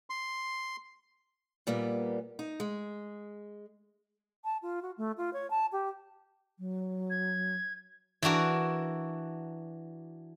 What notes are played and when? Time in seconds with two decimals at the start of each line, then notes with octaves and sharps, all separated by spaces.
0.10 C6
1.67 A#2 G3 A#3 B3
2.39 D#4
2.60 G#3
4.44 A5
4.62 F4
4.82 F#4
4.98 A3
5.17 F4
5.33 C#5
5.50 A5
5.72 G4
6.59 F#3
7.10 G#6
8.22 E3 D4 F#4 A#4